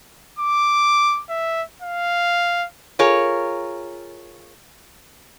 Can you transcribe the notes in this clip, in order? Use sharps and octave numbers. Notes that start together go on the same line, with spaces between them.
D6
E5
F5
F4 G#4 A#4 C#5